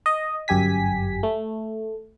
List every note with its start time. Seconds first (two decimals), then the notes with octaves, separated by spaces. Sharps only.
0.06 D#5
0.48 G1 F#2 G4 G#5 B6
1.23 A3